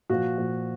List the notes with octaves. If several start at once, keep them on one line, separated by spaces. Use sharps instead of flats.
A#2 F3 F#4
A#2 F3